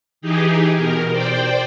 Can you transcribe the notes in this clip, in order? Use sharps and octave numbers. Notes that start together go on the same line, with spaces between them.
E3 D#4 G4 G#4
B2 A#4
C5 D5 G5